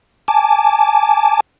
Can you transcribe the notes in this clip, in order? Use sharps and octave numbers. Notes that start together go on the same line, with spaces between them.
G#5 A5 D6